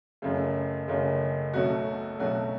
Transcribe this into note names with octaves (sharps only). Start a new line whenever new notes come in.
F#1 F#2 C#3 A3
F#1 F#2 C#3 A3
B1 B2 F#3 A3 F#4
B1 B2 F#3 A3 F#4